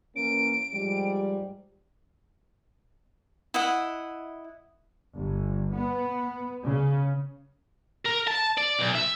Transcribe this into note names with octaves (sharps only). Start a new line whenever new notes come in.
E3 A#3 C#4 D7
G#2 F3 G3
E4 D#5 F#5
G1
B3
C#3
A#4
A5
D5
B1
E5